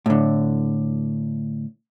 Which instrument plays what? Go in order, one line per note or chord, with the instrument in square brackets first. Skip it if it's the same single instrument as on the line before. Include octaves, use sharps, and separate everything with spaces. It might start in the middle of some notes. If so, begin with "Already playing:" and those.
[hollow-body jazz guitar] A2 D3